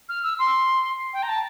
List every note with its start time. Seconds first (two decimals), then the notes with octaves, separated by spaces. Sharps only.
0.09 F6
0.23 E6
0.39 C6
1.13 G5
1.23 A#5
1.29 A5